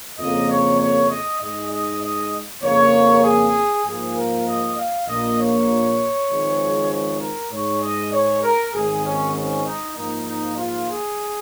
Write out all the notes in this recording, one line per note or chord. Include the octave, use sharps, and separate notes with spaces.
F2 C#3 A#3 D#5
C#5
C#5
D#5
G#2 G#3 D#5
D#5
D#5
F2 C#3 A#3 C#5
G#4
G#2 F3 A#3 G#4
A#4
D#5
F5
A#1 A#2 A#3 D#5
C#5
G#1 G#2 F3 G#3
C#5
A#4
G#2 G#3 C#5
D#5
C#5
A#4
G#1 G#2 G#3 G#4
C#4
C#4
D#4
G#2 F3 A#3 D#4
D#4
F4
G#4